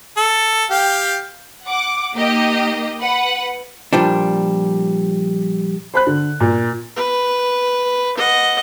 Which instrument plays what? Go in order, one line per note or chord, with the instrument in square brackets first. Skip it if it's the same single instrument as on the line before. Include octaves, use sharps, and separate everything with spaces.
[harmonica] A4
G4 F5 G5
[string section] F#5 D6
A#3 D#4 G4 D#5
B4 F#5
[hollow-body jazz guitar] A#2 F3 G3 D4
[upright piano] C5 B5 F#6
D3
A#2
[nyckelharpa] B4
D#5 F#5